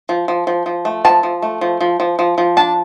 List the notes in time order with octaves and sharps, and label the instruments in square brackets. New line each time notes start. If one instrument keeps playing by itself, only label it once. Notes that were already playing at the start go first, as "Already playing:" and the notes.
[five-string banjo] F3
F3
F3
F3
A3
F3 A5
F3
A3
F3
F3
F3
F3
F3
D4 A5